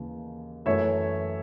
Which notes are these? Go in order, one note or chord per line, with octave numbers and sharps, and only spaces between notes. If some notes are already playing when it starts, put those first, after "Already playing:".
Already playing: D#2 C#3 E3
F#2 E3 A3 C#5 E5